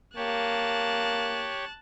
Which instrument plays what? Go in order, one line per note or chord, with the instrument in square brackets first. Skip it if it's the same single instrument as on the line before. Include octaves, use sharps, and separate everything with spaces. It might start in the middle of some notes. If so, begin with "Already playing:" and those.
[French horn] A#3 [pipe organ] G4 C#5 [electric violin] A5 F#6